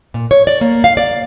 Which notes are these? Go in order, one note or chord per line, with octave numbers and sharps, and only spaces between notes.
A#2
C#5
D5
A#3
F5
D5